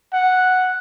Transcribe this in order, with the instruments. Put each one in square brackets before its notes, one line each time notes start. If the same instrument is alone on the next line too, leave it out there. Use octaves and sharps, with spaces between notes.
[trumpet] F#5